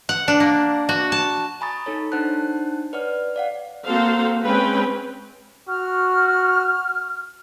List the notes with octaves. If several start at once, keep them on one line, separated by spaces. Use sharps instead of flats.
F#5
D4
A#3
F#4
A5
G#5 A#5 B5 C#6 D#6 A6
D#4 A4 C#5
D4 D#4 C5 F#5 A5 F#6
B4 C#5 D5 F#5 F6
D5 F5 F#5
A#3 C4 F#4 A4 C5 F5
G#3 C4 C#4 B4 G5
F#4 F6